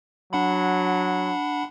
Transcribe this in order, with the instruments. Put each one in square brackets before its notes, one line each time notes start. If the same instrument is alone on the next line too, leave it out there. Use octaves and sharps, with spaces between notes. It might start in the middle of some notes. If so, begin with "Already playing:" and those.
[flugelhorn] F#3 [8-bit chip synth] D4 F#5 B5